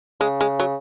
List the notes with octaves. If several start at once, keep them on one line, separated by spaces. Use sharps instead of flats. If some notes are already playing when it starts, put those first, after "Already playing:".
C#3 G#3
G#3
F#3